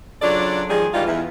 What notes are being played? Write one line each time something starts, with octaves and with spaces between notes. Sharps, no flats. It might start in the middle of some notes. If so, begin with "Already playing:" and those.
C#3 F#3 D4 F4 A4 D5
D#3 F3 G3 G#3 G#4
D#3 E3 G3 G#3 F4
E2 E3